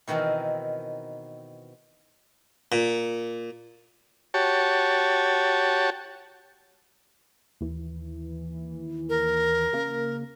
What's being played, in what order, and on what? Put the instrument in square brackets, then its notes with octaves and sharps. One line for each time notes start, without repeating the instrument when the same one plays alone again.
[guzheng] B2 D#3 E3 C4 A#4
[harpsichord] A#2
[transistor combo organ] F#4 G4 C#5 A5
[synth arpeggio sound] D#2 E3
[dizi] A#4
[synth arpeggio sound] C#3 A#3